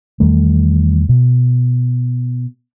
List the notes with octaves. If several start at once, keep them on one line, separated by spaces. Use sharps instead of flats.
E2 D#3 G3 A3
B2